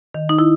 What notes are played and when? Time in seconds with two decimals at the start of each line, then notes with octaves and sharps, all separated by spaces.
0.14 D#3
0.29 D#4
0.39 E4